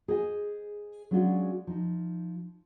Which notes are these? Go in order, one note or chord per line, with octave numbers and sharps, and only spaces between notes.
G#4 C5 D#5 G5 G#5
F#3 G#3 C#4 D4 F4 F#4
F3 D#4